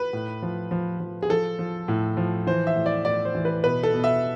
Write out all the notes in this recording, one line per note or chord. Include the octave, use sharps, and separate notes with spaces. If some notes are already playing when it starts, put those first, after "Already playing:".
Already playing: B4
A2
F3
F3
F3
G#4
F3 A4
F3
A2
F3
E3 C5
E5
A2
D5
A2 D5
C5
E3
B4
B2 B4
A4
B2
E5